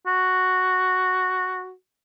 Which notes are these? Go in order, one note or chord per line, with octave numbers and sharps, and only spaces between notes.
F#4